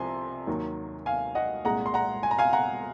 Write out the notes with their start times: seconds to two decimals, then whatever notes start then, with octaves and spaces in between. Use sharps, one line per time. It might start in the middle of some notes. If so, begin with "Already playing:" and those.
Already playing: C2 C3 F3 G#5 C6
0.47 D#2 D#3 F#3
1.06 F5 G#5
1.35 D#5 F#5
1.64 C2 A#2 G#3 F#5 A#5
1.86 C6
1.94 F#5 A#5
2.23 G#5
2.31 A#5
2.38 F5 G#5
2.53 F#5 A#5